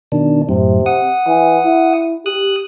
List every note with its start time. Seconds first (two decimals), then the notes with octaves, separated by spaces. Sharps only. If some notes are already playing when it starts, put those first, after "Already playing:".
0.12 B2 D#3 D4
0.49 F#2 A2 C3
0.86 F#5 D#6
1.27 E3
1.65 E4
2.26 G4 D#6 F#6